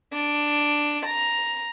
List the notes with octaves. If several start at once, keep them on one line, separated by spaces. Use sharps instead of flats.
D4
A#5